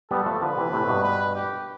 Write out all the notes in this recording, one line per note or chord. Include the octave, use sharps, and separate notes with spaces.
G3 B3 A4
F3 A3
D3 F3 B4
C3 E3
A2 C3
G2 B2
B4
G4